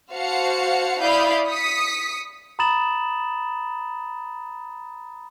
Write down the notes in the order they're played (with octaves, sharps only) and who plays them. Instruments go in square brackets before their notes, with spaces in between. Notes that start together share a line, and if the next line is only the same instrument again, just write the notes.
[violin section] F#4 C5 F5 F#5 A5 C#7
E4 D5 F5 B5 D#6 G6
D#6 B6 C#7
[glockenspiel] A#5 B5 D#6 A6 E7 F#7